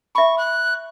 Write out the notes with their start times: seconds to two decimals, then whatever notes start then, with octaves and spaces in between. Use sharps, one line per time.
0.15 E5 B5 C#6
0.38 F#6